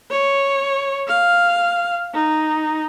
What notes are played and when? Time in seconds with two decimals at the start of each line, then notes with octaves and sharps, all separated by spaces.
0.10 C#5
1.08 F5
2.14 D#4